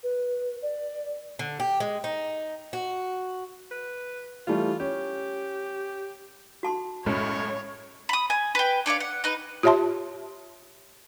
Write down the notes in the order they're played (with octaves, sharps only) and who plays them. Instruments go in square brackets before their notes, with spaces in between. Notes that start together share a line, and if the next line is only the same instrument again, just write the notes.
[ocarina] B4
D5
[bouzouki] D3
G4
G#3
D#4
F#4
[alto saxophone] B4
[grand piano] E3 G3 A3 [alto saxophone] F4
[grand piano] C#4 [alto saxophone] G4
[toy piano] F#4 A5 C6
[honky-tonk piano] B1 F#2 A2 [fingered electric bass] G#3 [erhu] C#5
[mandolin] B5 D#6
G#5
B4 G5
D4 C#5 D5 F5
F#5
D#4 B4
[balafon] F4 G4 C#5 E5 A5 C6